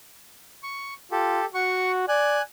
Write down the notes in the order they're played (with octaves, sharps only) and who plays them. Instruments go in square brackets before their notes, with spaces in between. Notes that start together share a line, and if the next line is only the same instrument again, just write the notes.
[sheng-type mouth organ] C#6
[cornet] F4 [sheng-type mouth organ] G4 A4
[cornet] F#4 [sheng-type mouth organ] F#5 C#6
[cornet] D5 [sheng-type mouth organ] G#5 F#6